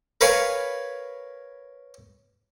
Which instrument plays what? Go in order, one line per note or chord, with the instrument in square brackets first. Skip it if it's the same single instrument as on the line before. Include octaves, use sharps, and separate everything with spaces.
[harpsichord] A#4 B4 C#5 F5 G#5